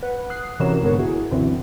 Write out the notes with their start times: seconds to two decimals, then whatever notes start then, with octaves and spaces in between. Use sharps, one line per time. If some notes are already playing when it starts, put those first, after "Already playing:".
0.03 B4 F#5
0.30 D#6 F#6 C7
0.60 C3 E3 C#4 F#4 A#4 E7
0.82 A#1 G#2 D3 B3 A#4 C#5
0.98 E4 F#4 G#4
1.31 C2 F#2 B2 D3 E3 C4